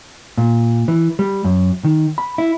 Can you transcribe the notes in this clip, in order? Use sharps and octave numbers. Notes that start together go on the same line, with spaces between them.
A#2
E3
G3
F#2
D#3
B5
E4